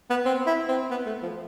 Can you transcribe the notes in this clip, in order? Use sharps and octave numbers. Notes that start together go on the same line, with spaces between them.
B3
C4
E4
C4
B3
A3
F3